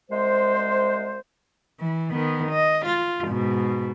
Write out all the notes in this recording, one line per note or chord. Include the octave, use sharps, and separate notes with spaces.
C2 G#3 C5
E3
D#3 B3
D#5
F4
G#2 B2